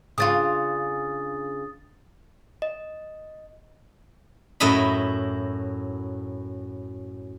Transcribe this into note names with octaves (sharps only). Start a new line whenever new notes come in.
C#3 D4 F4 D#6 A6
D#5
F#2 A2 E4 D#5 B5